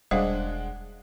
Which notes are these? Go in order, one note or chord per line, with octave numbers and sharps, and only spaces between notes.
E1 G3 G#3 D4 C5 F5 F#5